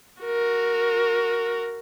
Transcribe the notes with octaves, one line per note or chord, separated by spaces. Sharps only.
F#4 A#4